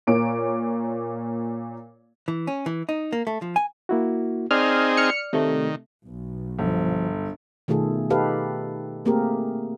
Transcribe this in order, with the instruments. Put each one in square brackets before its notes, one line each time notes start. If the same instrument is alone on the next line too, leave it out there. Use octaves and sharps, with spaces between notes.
[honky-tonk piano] A#2 A#3 C#5 D6 D7
[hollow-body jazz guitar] E3
C#4
E3
D#4
A#3
A3
F3
G#5
[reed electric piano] A#3 E4 F#4
[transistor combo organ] C4 D#4 G#4 [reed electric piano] D5 [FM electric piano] F6
[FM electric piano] F6 C#7
[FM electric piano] C3 A3 [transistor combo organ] D#3
[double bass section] B1
[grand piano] G1 [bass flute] F3
[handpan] B2 D#3 A3 F4 G#4 A4
D#4 G4 A4 B4 F5
A3 A#3 C4 G4 G#4 A#4